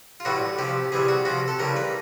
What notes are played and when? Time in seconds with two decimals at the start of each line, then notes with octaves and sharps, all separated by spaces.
0.20 F4
0.25 A2 E3 G3 F#4
0.58 C3 F3 G4
0.92 C3 E3 G3 G#4
1.08 F#4
1.25 C3 F3 F#4
1.48 A4
1.59 C#3 E3 G3 A#4
1.76 B4